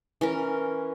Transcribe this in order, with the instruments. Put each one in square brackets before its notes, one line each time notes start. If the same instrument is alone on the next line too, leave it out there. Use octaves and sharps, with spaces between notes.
[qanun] E3 C#4 A#4